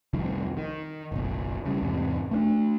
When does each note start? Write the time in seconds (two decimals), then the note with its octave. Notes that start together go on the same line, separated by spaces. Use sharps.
0.13 C2 F2 D#3 F3
0.57 D#3
1.12 F#1 B1
1.65 C#3 G3
1.82 E2 G#2 C3
2.31 A3 A#3 D4